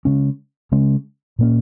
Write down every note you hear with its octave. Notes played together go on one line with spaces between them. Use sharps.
C#3 G#3 C#4
C#3 G#3 C#4
A#2 A#3 C#4